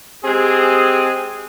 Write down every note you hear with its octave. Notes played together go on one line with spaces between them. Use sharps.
G#3 C4 G4 G#4